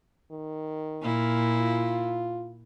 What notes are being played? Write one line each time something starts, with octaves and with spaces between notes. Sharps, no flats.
D#3
A#2 E4
F4